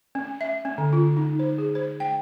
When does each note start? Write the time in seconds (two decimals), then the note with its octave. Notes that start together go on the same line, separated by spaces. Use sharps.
0.15 C#4
0.41 E5
0.65 C#4
0.78 D3
0.93 F4
1.17 D#4
1.39 C5
1.58 G#4
1.75 C5
2.00 G5